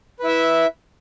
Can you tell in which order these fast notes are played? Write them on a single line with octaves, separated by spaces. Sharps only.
B4 E4 E5